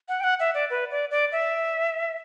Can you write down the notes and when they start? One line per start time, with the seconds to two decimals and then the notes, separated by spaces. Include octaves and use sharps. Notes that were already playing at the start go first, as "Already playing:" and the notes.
0.09 F#5
0.20 G5
0.24 F#5
0.40 E5
0.54 D5
0.70 B4
0.91 D5
1.11 D5
1.32 E5